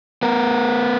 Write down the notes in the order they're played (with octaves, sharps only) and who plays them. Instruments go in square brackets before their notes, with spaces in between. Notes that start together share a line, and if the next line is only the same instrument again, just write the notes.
[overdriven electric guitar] B3 A#4